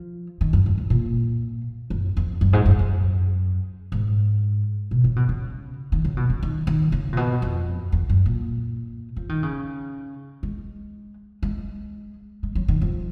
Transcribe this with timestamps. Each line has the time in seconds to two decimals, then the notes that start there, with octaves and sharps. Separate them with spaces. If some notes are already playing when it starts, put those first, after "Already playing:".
Already playing: F3
0.41 D#3
0.53 F#2
0.66 F#2
0.78 F#2
0.90 A#2
1.90 F#2
2.17 F2
2.41 F#2
2.53 G#2
2.66 F#2
2.79 F#2
3.92 G#2
4.91 B2
5.04 C#3
5.16 B2
5.29 C#3
5.92 D#3
6.04 C#3
6.17 B2
6.30 C#3
6.43 D#3
6.67 D#3
6.92 C#3
7.13 A#2
7.17 B2
7.42 F2
7.92 F2
8.09 F#2
8.26 A#2
9.16 F3
9.29 D#3
9.43 C#3
10.43 G#3
11.43 G#3
12.43 G#3
12.55 F#3
12.68 D#3
12.81 F3